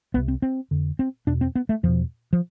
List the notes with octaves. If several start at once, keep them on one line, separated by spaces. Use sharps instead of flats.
C2 C3 B3
C4
C4
F2 D3
C4
E2 B2 D4
C4
B3
A3
E2 B2 F3
F3